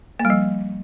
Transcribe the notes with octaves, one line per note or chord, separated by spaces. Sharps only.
A#3
G3
F3